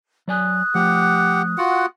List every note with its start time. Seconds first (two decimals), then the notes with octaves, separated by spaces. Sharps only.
0.28 F#3 D5 G#5 D#6 F#6
0.75 F3 A3 G4 F#5
1.58 F4 F#4 F#5